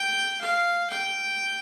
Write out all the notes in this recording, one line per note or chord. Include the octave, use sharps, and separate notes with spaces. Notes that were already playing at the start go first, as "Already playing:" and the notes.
Already playing: G5
F5
G5